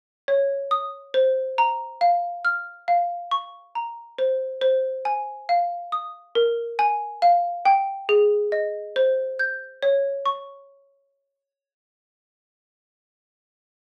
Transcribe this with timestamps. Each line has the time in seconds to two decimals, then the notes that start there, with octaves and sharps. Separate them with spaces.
0.28 C#5
0.71 D#6
1.14 C5
1.58 A#5
2.01 F5
2.45 F6
2.88 F5
3.31 C#6
3.75 A#5
4.18 C5
4.62 C5
5.05 G#5
5.49 F5
5.92 D#6
6.35 A#4
6.79 G#5
7.22 F5
7.65 G5
8.09 G#4
8.52 D#5
8.96 C5
9.39 G6
9.83 C#5
10.26 C#6